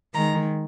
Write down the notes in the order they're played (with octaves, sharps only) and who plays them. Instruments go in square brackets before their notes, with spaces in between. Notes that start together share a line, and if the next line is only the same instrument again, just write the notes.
[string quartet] D#3 G#3 A#5